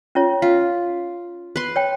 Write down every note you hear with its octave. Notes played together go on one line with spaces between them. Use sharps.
C#4 F4 C#5
F4 F5
B4 C6
C#5 G5